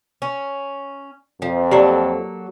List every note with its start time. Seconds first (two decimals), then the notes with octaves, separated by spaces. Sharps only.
0.22 C#4
1.42 F2 F3
1.71 F#3 A#3 G4 A4 D5 A#5